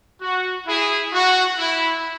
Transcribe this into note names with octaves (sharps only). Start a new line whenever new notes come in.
F#4
E4 G#4
F#4
E4